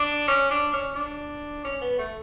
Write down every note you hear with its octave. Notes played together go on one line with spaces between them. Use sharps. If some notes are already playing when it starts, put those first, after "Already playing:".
Already playing: D4
C#4
D4
C#4
D4
C#4
B3
A3